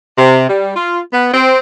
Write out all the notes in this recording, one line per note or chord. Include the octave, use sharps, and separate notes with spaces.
C3
G3
F4
B3
C4